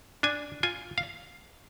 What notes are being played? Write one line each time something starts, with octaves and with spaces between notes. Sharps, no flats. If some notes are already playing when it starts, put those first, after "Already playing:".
D4 G#5
F4 G#5
F5